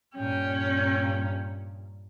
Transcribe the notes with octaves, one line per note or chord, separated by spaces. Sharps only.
G2 A#2 C#4 G5